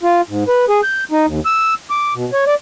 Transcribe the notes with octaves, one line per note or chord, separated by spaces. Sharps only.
F4
G#2
B4
G#4
G6
D#4
D#2
E6
D6
B2
C#5
D5